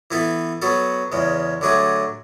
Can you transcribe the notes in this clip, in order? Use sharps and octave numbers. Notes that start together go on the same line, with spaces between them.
E3 B3 E4 A4
F#3 B3 F#4 A4
E2 C#3 G#3
D3 F#3 A3 D4 G#4